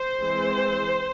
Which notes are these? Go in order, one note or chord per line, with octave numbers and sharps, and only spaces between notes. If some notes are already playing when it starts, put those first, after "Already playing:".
Already playing: C5
E3 G#3 C4